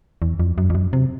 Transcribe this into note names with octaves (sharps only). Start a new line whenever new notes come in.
E2
F2
F#2
F2
F#2
C3